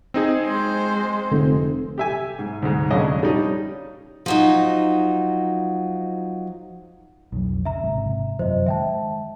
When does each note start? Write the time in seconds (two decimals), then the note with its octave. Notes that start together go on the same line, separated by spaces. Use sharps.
0.14 C4 D#4 G#4
0.47 G#3 C5
1.32 F1 D3
1.98 G4 E5 G#5
2.39 G#2
2.62 D2 G#2
2.91 A#1 F2 D3 C#4 D#5
3.23 G3 C#4 D#4
4.26 F3 F#3 D#4
7.32 B1 F2
7.65 C#3 E5 A#5
7.83 G#1 G#2 C3
8.39 F#2 C3 F3 C5 D#5
8.66 D#3 G#3 E5 G5 A5